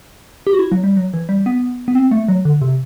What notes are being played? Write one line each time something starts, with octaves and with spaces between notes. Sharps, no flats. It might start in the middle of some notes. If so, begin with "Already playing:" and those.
G4
F#4
E4
F#3
G3
F#3
E3
G3
B3
B3
C4
A3
F#3
D3
C3